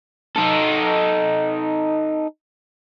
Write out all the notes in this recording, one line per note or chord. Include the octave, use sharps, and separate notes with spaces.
D#4 A4